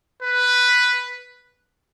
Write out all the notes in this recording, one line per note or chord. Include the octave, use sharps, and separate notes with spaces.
B4